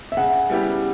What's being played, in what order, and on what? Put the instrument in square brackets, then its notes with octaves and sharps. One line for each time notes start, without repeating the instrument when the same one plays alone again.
[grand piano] E5
[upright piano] C#3 [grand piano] F#5
[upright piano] G3 B3 E4 G4